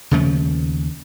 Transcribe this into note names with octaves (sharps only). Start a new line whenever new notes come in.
D#2 C#3 F3 A3